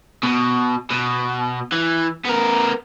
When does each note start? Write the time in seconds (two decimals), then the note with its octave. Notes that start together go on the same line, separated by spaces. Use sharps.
0.23 B2
0.90 B2
1.72 E3
2.25 B3 A#4